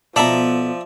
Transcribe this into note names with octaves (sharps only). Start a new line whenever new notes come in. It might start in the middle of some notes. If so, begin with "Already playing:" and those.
B2 F3 B3 F#4 A4 D5 E5 A#5